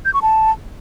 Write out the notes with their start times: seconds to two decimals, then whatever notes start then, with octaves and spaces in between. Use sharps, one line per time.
0.05 G6
0.14 C#6
0.22 A5